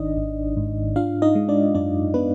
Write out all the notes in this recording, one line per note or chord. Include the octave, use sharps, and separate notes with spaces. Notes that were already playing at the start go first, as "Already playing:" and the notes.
Already playing: G#1 D#3 D4 D#4 D5 D#5
G#1
G#2
D4 F4 F5
D#4 D#5
G#3
D4 D5
F#2 D4 D5
B3 D4 B4